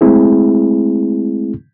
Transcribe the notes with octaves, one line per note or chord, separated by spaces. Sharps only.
G#3 A3 C4 E4 G#4